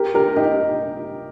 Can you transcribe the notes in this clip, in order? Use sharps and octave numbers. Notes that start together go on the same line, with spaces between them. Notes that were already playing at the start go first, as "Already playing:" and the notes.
Already playing: G4 A#4
G4 A#4
D#4 G4